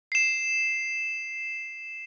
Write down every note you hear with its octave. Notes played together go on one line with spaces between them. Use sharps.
C7 E7